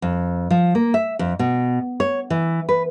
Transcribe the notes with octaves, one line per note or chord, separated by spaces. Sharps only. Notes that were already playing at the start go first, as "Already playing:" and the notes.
F2
F3
A#3
E5
F2
B2
C#5
E3
B4